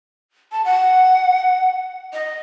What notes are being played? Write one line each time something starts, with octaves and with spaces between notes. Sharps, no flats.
A5
F#5
D#5